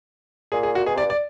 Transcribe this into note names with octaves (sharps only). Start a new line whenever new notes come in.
A#2 G#4
G#4
F#4
B2 G#4
C3 D5
G2
D5